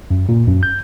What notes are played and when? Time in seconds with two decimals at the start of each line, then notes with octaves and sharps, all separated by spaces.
0.11 F#2
0.29 A#2
0.47 F#2
0.63 G6